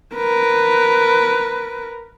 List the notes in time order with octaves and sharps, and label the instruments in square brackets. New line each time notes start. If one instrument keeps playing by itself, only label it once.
[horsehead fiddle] A#4 B4